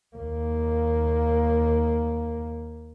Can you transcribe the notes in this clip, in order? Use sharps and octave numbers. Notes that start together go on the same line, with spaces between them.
D#2 A#3